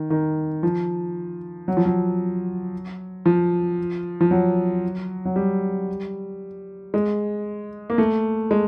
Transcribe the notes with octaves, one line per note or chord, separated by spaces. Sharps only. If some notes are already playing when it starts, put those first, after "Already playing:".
Already playing: D#3
D#3
F3
F#3
F3
F#3
F3
F3
F#3
F#3
G3
G#3
A#3
A3
G#3